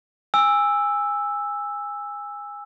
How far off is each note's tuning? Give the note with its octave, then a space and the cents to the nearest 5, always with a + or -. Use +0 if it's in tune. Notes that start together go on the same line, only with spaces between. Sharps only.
G#5 -20 E6 +0